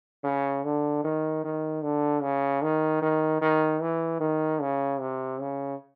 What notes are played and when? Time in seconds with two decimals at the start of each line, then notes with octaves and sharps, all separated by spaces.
0.24 C#3
0.64 D3
1.04 D#3
1.44 D#3
1.83 D3
2.22 C#3
2.62 D#3
3.02 D#3
3.42 D#3
3.82 E3
4.21 D#3
4.61 C#3
5.00 C3
5.40 C#3